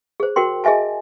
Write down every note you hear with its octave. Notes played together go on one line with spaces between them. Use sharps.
G#4 C5
F#4 A#4 G5 C6
G#4 D#5 E5 G#5 A5